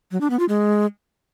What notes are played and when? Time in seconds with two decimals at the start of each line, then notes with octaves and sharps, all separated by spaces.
0.12 F#3
0.21 D4
0.30 B3
0.39 F4
0.49 G#3